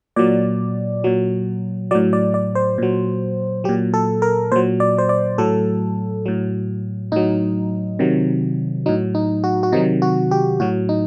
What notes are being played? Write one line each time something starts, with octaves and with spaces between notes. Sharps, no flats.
A#2 F#3 D5
A#2 F#3
A2 F#3 D5
D5
D5
C5
A#2 F#3
A#2 F#3 G4
A4
A#4
A#2 F#3 C5
D5
C5
D5
A2 F#3 A4
A2 F#3
A2 F#3 D#4
C3 D#3 F#3
A2 F#3 D#4
D#4
F#4
F#4
C3 D#3 F#3 D#4
F#4
G4
A2 F#3 F#4
D#4